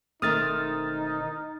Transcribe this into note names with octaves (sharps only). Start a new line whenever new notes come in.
E1 D#3 A3 C4 D#4 D#6 F6 A6